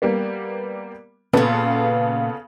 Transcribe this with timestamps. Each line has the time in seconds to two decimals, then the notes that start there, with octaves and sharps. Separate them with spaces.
0.02 G3 A#3 B3
1.33 A#2 C#3 B3 F4 A4